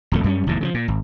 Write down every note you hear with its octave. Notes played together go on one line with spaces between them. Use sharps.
D1 F2 A3
F#2 G3 A3 C#4
F1 D#2 G#2 E3
C#3 E3 F3
A#2
G#1